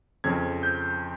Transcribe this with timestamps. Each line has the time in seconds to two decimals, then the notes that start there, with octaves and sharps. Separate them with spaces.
0.24 F2 C#3 F3 C4 G#6
0.63 G6